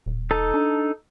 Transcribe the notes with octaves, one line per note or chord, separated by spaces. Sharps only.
D#1
D#4 A4 A5
D4